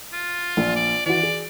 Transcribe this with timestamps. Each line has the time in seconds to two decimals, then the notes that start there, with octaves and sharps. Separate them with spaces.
0.13 F4
0.57 A#1
0.76 D5
1.06 E3 F#4 D5
1.23 G#4